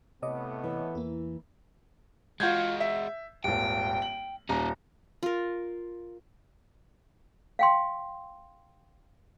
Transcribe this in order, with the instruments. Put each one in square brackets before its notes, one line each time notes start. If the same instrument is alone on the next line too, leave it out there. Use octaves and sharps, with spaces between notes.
[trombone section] A2 A3 B3 [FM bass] C3 [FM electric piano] C#5 D#5 D6
[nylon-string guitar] E3
[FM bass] E2 [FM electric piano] A#3 E4
[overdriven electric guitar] G#3 F#4 [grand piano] F4 G6 G#6
[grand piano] E5
[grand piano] D#1 G#1 [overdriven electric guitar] G5
[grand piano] F#7
[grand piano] D#1 A#5 [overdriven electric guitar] C#4 D#4
[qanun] F4 A#4
[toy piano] F5 G5 C6